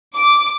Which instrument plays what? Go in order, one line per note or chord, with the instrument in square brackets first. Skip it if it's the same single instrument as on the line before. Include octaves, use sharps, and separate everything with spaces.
[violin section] D6